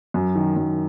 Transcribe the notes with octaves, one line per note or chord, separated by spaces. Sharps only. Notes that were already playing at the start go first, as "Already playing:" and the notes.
F#2
D#3
F#2